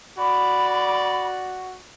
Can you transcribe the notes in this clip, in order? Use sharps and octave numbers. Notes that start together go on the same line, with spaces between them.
F#4 D5 B5